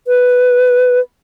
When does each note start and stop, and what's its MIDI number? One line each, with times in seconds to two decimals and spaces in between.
0.07 1.00 71